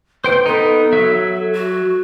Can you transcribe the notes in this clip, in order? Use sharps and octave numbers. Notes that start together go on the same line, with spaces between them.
B4 C5 G5
B3 D#4 A4
F#3 E5
F#4